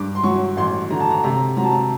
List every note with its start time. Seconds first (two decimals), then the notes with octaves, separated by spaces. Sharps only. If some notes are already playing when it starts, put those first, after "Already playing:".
Already playing: G2 D6
0.15 C6
0.23 F#3 C#6
0.57 A1 C6
0.90 D3 A#5
1.00 A5
1.11 A#5
1.24 C3 A#5
1.57 F#3 A#5
1.64 A5
1.71 A#5